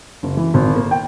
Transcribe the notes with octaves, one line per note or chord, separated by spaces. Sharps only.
F#1
E3
G#1
A#3
G5